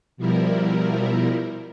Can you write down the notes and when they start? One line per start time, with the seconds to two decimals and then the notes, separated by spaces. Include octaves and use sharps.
0.17 B2 F3 G3 E4 A#4